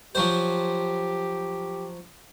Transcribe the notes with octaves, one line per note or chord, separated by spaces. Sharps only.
F3 F#3 G4 C5